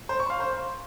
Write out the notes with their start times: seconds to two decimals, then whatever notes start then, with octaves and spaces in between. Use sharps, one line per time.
0.09 C5
0.20 C#6
0.30 F5
0.40 C5